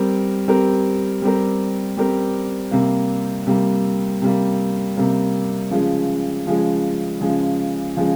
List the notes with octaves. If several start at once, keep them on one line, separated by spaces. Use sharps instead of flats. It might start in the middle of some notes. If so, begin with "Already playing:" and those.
Already playing: G3 C4 G4 A#4
G3 C4 G4 A#4
G3 C4 G4 A#4
G3 C4 G4 A#4
C3 G3 A#3
C3 G3 A#3
C3 G3 A#3
C3 G3 A#3
C#3 F3 G#3
C#3 F3 G#3
C#3 F3 G#3
C#3 F3 G#3